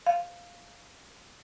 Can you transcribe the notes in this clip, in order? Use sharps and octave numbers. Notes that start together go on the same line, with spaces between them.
F5